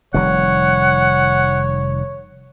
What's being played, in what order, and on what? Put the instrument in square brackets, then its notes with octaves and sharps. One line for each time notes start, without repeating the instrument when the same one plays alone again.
[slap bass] F1 D#3 G3 [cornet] C#5 [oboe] F#5